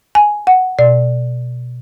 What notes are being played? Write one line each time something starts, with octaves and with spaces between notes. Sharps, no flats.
G#5
F#5
B2 D5